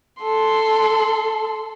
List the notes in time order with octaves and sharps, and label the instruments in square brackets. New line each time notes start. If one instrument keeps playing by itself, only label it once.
[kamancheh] A4 C6